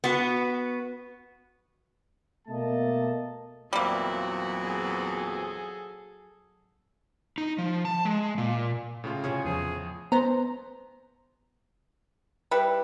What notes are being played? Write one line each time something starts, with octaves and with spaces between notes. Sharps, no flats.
B3 F#4
B2 A3 A#3 D#5 A5
E2 A#2 F#3 G3 A#3 C4 F#4 E5
G#4 A4
D#4
F3
A5
G#3
A#2
A2 C#3 F4
C3 C#4 G#4 C#5
E2 F3 G#4
B3 C5 A#5
G3 E4 B4